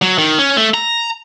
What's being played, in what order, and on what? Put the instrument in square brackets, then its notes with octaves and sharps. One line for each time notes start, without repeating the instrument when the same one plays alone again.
[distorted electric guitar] F#3
D#3
C#4
A3
A#5